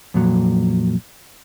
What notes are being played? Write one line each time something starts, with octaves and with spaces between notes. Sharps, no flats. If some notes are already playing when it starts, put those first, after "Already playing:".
F2 A#2 F#3